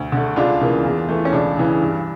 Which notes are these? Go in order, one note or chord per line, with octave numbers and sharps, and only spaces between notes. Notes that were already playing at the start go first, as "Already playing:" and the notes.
Already playing: D2
D3 A3
C#2 D4 F4
C#3 E3 A#3
E2
E3 A3
C#4
C#2 D4
C#3 E3
G2